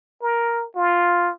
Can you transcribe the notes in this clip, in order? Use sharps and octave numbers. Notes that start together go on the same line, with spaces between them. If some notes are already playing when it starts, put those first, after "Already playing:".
A#4
F4